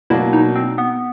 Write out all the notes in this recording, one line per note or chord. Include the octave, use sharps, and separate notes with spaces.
B2 F#3 A#3 D4 E4
D#4
C4
B3